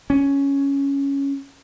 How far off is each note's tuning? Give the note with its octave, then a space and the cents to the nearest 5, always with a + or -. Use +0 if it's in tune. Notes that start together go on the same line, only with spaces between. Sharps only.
C#4 +5